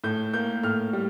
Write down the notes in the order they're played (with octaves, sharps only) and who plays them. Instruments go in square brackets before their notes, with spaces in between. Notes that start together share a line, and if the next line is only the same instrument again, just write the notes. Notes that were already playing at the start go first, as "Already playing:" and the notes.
[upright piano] A2 G6
A#3 G6
A2 F6
G3